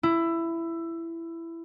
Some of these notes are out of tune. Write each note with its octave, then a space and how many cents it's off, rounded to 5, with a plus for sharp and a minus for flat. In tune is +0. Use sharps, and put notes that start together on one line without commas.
E4 +15